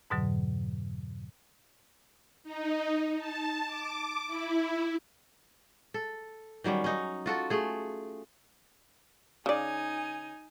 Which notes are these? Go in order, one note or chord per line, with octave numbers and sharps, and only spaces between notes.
F2 G#2 B2 D3 F#3
D#4
A5
D6
E4
A4
D#3 F#3 G3 C#4
C#4 D#4
F4 F#4 A4
A3 G#4
C#3 D#4 D5 G#5